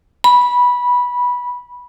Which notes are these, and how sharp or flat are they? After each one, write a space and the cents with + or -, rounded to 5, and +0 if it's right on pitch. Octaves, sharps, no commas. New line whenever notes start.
B5 -15